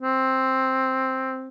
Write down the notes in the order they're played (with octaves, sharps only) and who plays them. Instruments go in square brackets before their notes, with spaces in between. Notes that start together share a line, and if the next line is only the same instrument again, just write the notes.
[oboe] C4